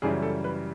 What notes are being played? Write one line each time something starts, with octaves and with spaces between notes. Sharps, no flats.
F#2 C#3 E3 G3 G#4
A4
B4